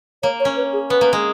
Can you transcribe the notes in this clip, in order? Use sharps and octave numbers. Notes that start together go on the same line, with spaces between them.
A#3 C#5
C#5
C#4
B4
G#4
B3 B4
A#3
G#3